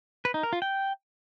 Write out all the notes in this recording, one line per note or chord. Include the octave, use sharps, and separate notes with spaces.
B4
D#4
A#4
F4
G5